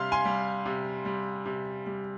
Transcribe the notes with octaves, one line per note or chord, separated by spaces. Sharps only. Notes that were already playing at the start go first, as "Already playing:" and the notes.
Already playing: C3 G3 F5 C6
G#5 C6
G3
C3
G3
C3
G3